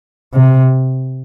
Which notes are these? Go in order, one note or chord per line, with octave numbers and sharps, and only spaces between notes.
C3